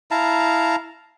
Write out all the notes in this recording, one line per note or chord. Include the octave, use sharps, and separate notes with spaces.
E4 F5 A5 A#5